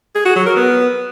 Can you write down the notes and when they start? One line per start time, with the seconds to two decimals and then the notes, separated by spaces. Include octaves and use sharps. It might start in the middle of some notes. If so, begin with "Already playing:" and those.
0.15 G#4
0.25 F#4
0.36 F#3
0.46 A#4
0.56 B3